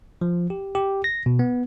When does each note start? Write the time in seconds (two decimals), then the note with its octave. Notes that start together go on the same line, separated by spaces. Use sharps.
0.21 F3
0.50 G4
0.75 G4
1.04 A#6
1.26 B2
1.39 B3